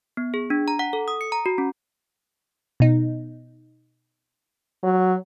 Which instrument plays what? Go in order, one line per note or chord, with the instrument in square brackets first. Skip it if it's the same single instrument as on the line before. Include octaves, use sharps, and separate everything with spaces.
[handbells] B3
G#4
D4
A#5
F#5
A4
D#6
C#7
A#5
F#4
C#4
[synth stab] B2 D#4
[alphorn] F#3